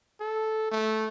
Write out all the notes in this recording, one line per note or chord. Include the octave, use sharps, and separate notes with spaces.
A4
A3